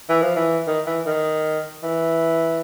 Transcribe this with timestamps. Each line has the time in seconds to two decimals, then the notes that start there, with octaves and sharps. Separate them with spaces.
0.09 E3
0.22 F3
0.36 E3
0.67 D#3
0.86 E3
1.06 D#3
1.83 E3